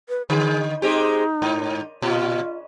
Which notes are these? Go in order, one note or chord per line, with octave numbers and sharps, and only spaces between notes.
B4
D3 G#4
G#3 C4 D#4 G4
G#2
A#2 F4